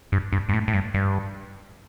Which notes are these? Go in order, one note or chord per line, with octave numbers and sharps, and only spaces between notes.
G2
G2
G2
A2
A2
G2
G2